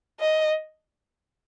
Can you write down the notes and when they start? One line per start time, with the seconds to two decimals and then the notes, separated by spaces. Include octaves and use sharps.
0.20 D#5